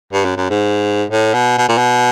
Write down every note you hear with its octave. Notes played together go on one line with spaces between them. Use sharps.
G2
F#2
F#2
G#2
A2
B2
B2
A#2
B2